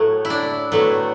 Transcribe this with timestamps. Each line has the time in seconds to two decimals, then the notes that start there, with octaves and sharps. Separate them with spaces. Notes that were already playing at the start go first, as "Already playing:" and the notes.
Already playing: A2 F#3 A3
0.25 E4
0.30 D4
0.72 A2 F#3 A3 B3